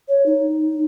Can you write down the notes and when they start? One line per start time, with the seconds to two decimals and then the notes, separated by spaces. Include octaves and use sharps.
0.08 C#5
0.26 D#4